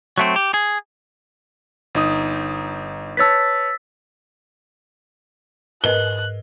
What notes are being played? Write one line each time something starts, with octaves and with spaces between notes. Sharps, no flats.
F#3 A3 C4
G4
G#4
G1 D#4 D#6
B4 C#5 A5 E6 A6 B6
G#2 A#4 B4 D#5 F#6 G7